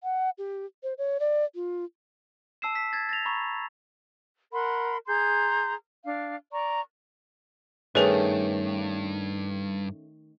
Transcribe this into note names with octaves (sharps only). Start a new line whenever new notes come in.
F#5
G4
C5
C#5
D5
F4
A5 E6 C7 E7
B6
G#6 A6
A6 A#6 F7
A#5 B5 C#6
A#4 F#5 B5 C6
G#4 A#5 C6 G6
D4 F5
D5 A#5 C#6
G2 D#3 A3 C#4 G#4 B4